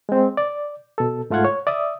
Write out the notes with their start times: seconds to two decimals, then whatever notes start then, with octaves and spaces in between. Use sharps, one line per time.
0.09 G#3 C4
0.37 D5
0.98 B2 A4
1.30 G#2 A3 F4 F5 F#5 G#6
1.45 C#5
1.67 D5 E5 D#6